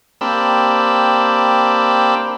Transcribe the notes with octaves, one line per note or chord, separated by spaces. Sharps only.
A#3 C4 D4 G4 B5 E6